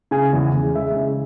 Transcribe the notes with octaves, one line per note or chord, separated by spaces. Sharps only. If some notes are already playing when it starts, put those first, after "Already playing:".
C#3 G#5
E2
E2
G#3 E5
C#3